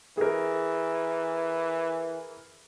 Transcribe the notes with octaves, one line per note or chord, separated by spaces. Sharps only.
E3 G#4 A#4